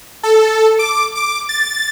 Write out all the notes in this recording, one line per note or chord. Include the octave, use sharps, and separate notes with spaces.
A4
D6
D6
A6